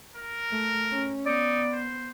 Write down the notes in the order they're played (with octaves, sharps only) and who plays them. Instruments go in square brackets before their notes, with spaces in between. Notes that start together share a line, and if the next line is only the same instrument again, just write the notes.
[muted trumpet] A#4
[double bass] A3
C#4
[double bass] B3 [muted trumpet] D#4 [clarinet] D5
[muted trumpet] C5